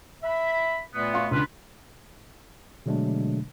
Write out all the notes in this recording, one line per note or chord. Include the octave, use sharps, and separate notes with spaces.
E5 B5
A#2 A3 B3
F5 C6 C#6
C#2 D3 F4 B4
B2 D3 F#3 G#3 A3 D4